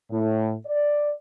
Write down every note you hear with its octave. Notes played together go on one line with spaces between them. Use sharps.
A2
D5